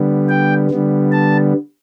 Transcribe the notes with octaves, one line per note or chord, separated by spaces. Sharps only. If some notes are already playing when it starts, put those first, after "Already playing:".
Already playing: D3 G3 B3
G5
D3 G3 B3
A5